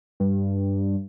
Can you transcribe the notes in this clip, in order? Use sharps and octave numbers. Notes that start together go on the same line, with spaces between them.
G2